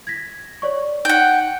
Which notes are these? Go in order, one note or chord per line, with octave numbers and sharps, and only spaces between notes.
G#6 A#6 B6
C#5 D5 C#6
D#4 F#5 G5